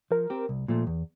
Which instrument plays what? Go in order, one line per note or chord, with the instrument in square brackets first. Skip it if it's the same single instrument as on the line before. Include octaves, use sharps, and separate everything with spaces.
[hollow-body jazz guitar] F3 [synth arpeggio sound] A#4
[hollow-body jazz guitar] C4 G4
C2
A#2 F3 A3
E2